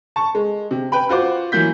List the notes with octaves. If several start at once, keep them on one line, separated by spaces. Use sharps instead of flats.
A5 C#6
G#3
C3
B4 G5 B5
F4 F#4 C5 D6
E3 F#3 A#3 G6 B6